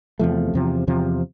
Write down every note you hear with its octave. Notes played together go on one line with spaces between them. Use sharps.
E2 C3 F3 A3
E2 C3 F3
E2 C3 F3